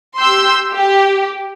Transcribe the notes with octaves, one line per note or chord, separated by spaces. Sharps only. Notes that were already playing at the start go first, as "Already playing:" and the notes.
G4 C6 E6 G6
G4